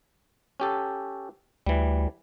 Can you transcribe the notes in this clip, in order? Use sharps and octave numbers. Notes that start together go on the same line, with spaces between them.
C#4 G4 A4
D2 E3 G3